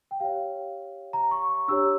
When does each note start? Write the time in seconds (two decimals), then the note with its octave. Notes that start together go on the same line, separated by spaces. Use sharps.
0.11 G5
0.20 G4 C#5 F5
1.13 A#5
1.31 C#6
1.68 D4 G4 C#5 E6